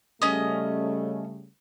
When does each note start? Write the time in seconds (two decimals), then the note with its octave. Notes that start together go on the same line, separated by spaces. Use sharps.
0.22 C#3 G3 A3 C#4 D#5